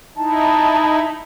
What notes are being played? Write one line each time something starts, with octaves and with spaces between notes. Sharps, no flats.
D#4 E4 A5